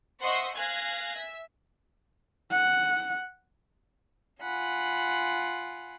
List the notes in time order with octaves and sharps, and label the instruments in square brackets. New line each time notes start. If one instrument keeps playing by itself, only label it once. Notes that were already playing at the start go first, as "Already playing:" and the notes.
[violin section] C5 D#5 E5 F#5 C6 C#6
F5 G#5 F#6 G#6 A#6
E5
[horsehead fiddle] F#5
[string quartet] F4 F#5 G#5 B5